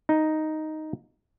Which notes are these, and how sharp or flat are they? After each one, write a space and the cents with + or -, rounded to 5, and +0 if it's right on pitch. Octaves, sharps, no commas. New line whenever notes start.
D#4 +0